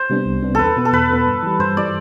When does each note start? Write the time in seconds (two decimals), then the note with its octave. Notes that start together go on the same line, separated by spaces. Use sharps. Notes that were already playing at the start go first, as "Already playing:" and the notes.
Already playing: C5
0.09 C3 G3 B3 D4
0.25 C2
0.43 C3 G3 B3 D4
0.55 E2 A4 B4
0.77 B2 B3
0.85 A4
0.92 E2 B4
1.10 B2 B3
1.26 G2
1.43 E3 G3
1.59 G2 C5
1.77 E3 G3 D5